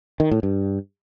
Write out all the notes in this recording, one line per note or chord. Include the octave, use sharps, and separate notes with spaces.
D#3
A2
G2